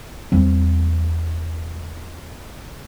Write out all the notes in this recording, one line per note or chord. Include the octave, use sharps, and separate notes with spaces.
E2 G3 C4